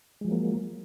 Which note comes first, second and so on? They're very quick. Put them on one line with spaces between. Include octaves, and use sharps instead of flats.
G#3 F3 F#3 A#3